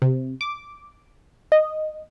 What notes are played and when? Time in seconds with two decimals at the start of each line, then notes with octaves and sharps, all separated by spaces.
0.02 C3
0.41 D6
1.52 D#5